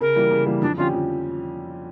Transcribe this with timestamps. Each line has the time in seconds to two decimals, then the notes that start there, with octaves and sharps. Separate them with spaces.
0.01 C#3 A#4
0.16 E3 G3 A#3
0.31 C#3
0.46 E3 G3 A#3
0.62 F2 D4
0.77 D3 F3 C#4 F4 G4
0.93 F2